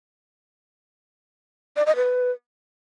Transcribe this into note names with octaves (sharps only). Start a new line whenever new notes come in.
D5
D#5
B4